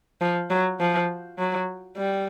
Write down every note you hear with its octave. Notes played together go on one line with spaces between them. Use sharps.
F3
F#3
F3
F#3
G3